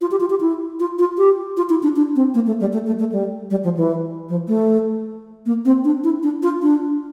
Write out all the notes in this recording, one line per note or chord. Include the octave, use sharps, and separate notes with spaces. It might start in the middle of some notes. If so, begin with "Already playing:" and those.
F4
G4
F4
G4
E4
F4
F4
G4
F4
E4
D4
D4
C4
A#3
A3
G3
A3
A3
A3
G3
G3
F3
E3
F3
A3
A#3
C4
D4
E4
D4
F4
D4